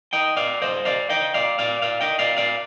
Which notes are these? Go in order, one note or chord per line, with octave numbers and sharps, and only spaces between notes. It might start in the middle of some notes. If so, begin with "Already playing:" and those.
D#5 G5
D5 F5
C5 D#5
D5 F5
D#5 G5
D5 F5
D5 F5
D5 F5
D#5 G5
D5 F5
D5 F5